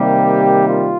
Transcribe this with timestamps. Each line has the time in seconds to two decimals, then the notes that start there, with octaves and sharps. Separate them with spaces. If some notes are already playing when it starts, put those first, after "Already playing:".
Already playing: C3 D#3 G3 A#3 G4
0.67 F4